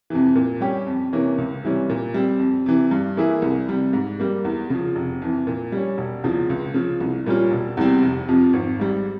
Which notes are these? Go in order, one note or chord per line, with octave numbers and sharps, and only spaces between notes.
F2 C3 E3
A#2
G3 C#4 G4
F2
C3 E3 A#3 C#4
C#2
C3 E3 G3 C#4
A#2
G3 C4
F2
C3 E3
G2
E3 A#3 E4 G#4
C2
C3 G3
G#2
G3 A#3
E2
C#3 F3
F1
F2 E3
A#2
G3 C#4
E1
E2 C#3 F3
C#2
C#3 F3
C2
A#2 G3 C#4 F4
E1
E2 C3 G3 C4
F1
F2 C3 F3
G#1
G#2 G3